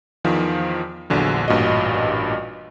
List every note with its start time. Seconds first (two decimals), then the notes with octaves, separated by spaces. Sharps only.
0.24 E2 D#3 F3
1.10 A#1 E2 D3 F#3
1.48 A1 G2 A#2 F#4 D#5